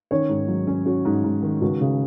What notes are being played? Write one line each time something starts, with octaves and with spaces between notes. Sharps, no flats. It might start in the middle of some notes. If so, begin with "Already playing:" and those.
D#3 C#4 C#5
G#2
F#3
C#4
C#4 F#4
G#2
G#2
D#3
C#2 F#4
C#3